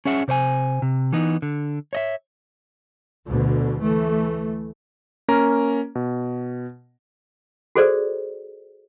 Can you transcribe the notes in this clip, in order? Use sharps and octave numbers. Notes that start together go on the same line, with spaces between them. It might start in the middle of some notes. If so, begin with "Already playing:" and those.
C#4 G#4 E5 F#5
C3 C5 C#5 G#5
C3
E3 B3 D#4
D3
C#5 D#5 E5
D2 B2 D3
E3 A3
A#3 C#4 A#4 A#5
B2
F#4 G#4 A4 C5 D5